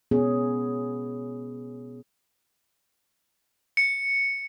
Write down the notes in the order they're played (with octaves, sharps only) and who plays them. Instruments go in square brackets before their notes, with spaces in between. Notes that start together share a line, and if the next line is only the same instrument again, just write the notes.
[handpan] B2 B3 C#4 G#4
[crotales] C#7